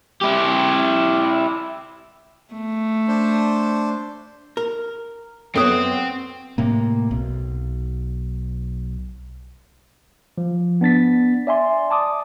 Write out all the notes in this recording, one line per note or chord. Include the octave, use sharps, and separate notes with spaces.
E4 G4
A3
D4 C5
A#4
F#2 B3 C4 A4 C#5 G5 D#6
A2 C3 A#3
B1
F3
B3 D4 A6 B6
D5 E5 G#5 C6
A5 D6 D#6